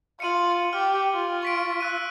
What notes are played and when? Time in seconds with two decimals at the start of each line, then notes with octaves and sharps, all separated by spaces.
0.20 F4 C#7 D#7 F#7
0.73 G4 F6
1.13 F4
1.43 C#6 B6 D7
1.80 E6 F#6 D#7